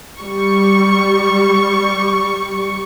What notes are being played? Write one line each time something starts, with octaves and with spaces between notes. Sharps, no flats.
G3 C#6